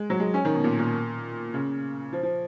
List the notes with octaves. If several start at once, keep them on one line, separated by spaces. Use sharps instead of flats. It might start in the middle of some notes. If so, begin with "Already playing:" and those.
Already playing: G#3
F#3
G#3
C#4
D#3
B2
A#2
A#2
C#3
F3
F3